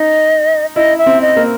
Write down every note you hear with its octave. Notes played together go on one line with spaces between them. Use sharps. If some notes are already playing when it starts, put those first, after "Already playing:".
Already playing: D#4 D#5
E4 D#5
E5
C4
D#5
A#3